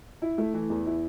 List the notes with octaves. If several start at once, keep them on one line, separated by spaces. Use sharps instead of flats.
E4
A3
E3
E2
E4